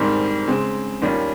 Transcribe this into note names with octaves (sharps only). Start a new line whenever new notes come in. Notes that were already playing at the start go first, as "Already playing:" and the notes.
Already playing: G#2 D#3 G3 C4
C#3 G#3 C4
D#2 D#3 G3 C#4 F4